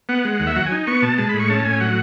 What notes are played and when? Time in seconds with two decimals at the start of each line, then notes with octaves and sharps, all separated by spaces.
0.09 B3 F#5
0.25 G#3
0.40 D#2
0.47 E5
0.56 F#3 F#5
0.66 G#5
0.71 D#4
0.87 B3 C#6
1.02 B2 A5
1.18 G#3 A5
1.29 B5
1.34 A2
1.40 C#6
1.50 C#4 A5
1.65 A2 G#5
1.80 F#3 F#5